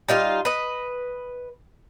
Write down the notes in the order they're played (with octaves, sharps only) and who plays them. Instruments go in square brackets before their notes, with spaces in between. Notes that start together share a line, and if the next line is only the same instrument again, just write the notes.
[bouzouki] G3 D#4 F4 F5
B4 D#5